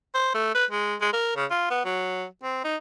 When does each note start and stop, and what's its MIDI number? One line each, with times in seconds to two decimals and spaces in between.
0.14 0.33 72
0.34 0.53 57
0.55 0.65 71
0.71 0.95 56
1.01 1.10 56
1.13 1.33 70
1.36 1.45 49
1.51 1.68 65
1.70 1.82 59
1.85 2.25 54
2.43 2.63 60
2.64 2.76 63